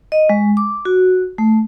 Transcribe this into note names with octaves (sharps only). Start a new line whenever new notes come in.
D#5
G#3
D6
F#4
A3